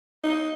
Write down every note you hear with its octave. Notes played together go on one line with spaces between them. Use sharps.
D#4